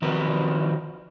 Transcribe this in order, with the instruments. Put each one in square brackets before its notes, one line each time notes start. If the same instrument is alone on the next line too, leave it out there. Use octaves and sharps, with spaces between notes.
[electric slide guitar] D#3 F3 C4 F#4 A#4 B4